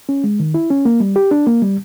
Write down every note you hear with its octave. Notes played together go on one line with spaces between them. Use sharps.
C#4
G#3
D#3
E4
C#4
A#3
G3
G4
D4
A#3
G3